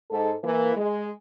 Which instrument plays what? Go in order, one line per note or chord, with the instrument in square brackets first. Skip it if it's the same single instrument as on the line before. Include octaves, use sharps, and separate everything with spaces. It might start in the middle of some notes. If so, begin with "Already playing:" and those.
[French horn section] G#2 A4
E3 A#3
G#3